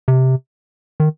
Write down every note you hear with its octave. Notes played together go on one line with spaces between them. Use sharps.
C3
D#3